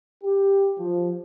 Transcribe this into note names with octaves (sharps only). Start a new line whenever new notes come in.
G4
F3